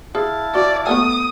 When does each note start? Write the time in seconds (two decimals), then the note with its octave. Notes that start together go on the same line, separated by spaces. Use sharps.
0.15 E4 G#4 F5 A5
0.55 F#4 D5
0.87 A3 B3 G#5 D#6